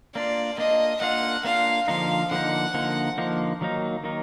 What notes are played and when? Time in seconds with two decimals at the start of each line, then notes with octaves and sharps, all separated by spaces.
0.14 A#3 D4 F4 D5
0.58 A#3 D4 F4 D#5
1.01 A#3 D4 F4 F#5
1.44 A#3 D4 F4 F5
1.88 D3 F3 A#3 D#4 F5
2.31 D3 F3 A#3 D#4 F#5
2.74 D3 F3 A#3 D#4
3.18 D3 F3 A#3 D#4
3.61 D#3 F#3 A#3 D#4
4.04 D#3 F#3 A#3 D#4